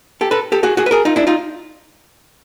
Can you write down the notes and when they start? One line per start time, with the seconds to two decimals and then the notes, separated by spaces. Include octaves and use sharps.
0.21 G4 A4
0.31 A4 B4
0.52 G4 A4
0.63 F#4 G#4
0.77 F#4 G#4
0.86 B4
0.91 G#4 A#4
1.05 D#4 F4
1.16 D4 E4
1.27 D#4 F4